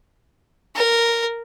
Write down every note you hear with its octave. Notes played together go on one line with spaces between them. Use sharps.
A#4